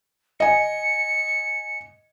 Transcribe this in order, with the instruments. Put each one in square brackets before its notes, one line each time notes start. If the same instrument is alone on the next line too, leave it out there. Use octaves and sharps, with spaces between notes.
[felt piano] D#5 G#5 [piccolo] C#7